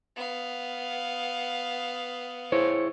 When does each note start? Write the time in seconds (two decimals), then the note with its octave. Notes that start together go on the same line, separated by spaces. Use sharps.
0.16 B3 F5
2.52 E4 G#4 C5 C#5